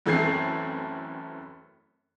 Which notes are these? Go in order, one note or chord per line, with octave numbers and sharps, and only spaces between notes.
F#2 E3 A3 C4 G#6 C7